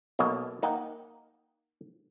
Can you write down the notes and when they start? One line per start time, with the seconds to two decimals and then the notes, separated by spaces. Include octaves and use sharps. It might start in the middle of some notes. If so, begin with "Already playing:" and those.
0.19 B1 B2 A#3 D#5
0.63 A#3 D#4 F#5 G5